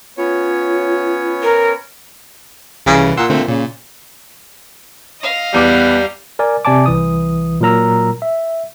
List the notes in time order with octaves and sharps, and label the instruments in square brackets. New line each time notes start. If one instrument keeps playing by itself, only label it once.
[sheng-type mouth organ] B3 C#4 C#5 [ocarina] F4
[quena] A#4
[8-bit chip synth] C2 E3 [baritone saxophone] C#3
[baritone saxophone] A#2 [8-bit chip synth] F#5 C6 E6
[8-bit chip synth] D3 A3 C4
[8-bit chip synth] A#2 [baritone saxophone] C#3
[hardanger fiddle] D#5 F5
[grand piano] E2 D6 [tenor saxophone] G3 [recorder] B3
[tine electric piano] A#4 D5 G#5
C3 D5 G#5 A5 D6
C2 E3 D#6
A#2 F#3 A#4 A#5 E6
E5